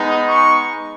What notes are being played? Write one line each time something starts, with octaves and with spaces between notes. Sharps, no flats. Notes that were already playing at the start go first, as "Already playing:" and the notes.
Already playing: G#3 B3 D#4
C#6